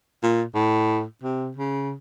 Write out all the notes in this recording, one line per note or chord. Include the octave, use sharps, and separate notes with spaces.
A#2
A2
C3
C#3